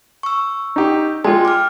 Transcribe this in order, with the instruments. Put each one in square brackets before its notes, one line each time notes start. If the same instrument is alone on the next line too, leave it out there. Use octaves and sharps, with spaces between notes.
[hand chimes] C#6 E6
[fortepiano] D#4 G4
[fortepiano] G#3 F4 [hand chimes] G5
[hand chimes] D6 F6